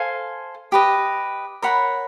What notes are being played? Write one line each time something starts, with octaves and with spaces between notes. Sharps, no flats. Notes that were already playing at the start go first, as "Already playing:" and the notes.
Already playing: A4 C5 F5 G#5
G4 B4 D#5
A#4 C#5 F#5 B5